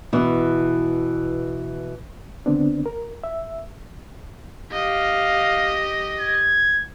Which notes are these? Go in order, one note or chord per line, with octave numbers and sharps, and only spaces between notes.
B2 E3
D3 B3 C4 D4
A#4
E5
G4 D#5 F5
G#6